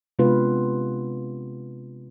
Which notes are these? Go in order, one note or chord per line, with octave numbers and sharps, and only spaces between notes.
C3 G#3 B3 D4 F4 B4